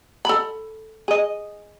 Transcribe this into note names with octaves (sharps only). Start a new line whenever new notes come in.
A4 B5
G#4 D#5